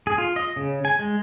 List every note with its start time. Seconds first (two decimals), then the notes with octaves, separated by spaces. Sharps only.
0.07 G#4
0.18 F4
0.36 D#5
0.56 C#3
0.85 G#5
0.99 G#3